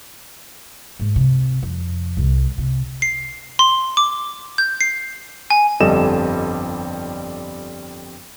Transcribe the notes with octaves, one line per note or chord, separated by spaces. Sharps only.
G#2
C3
F2
C2
C3
C7
C6
D6
G6
C7
G#5
G1 F2 G3 A4 D#5 E7